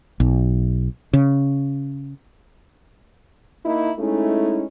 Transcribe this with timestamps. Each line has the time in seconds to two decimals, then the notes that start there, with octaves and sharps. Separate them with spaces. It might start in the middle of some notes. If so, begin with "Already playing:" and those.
0.20 B1
1.13 C#3
3.65 A#3 D#4 E4
3.99 G#3 A3 C#4 D#4 E4